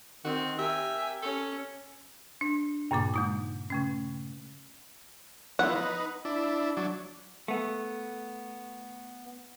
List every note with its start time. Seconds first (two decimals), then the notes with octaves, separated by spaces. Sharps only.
0.25 D#3 C4 F#4
0.59 G4 A#4 E5 G#5
1.22 C#4 A4 C#5
2.41 D4
2.91 G2 A#2 C#3 A#3 D6
3.14 G#3 D#4 D#6
3.70 C#3 A3 C#4
5.59 F3 B3 E4 F#5
5.75 D#4 B4
6.25 D4 E4
6.77 F#3 D4
7.48 A3 B3